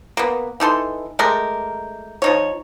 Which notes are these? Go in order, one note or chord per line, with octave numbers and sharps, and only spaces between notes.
A#3 B3
E3 D#4 A4 C6
G#3 A3 G4 A#4
F3 D#4 C#5